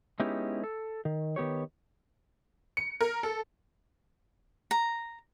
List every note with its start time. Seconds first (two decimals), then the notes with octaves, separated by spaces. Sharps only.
0.20 G#3 B3 C#4 D#4 E4 G4
0.64 A4
1.05 D#3
1.36 D#3 B3 G4 C#5
2.77 C#7
3.01 A#4
3.23 A4
4.71 A#5